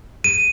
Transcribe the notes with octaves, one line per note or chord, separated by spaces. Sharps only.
D#7